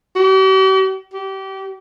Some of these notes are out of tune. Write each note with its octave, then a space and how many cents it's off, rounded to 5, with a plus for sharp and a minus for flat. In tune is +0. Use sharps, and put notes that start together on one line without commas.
G4 -45
G4 -30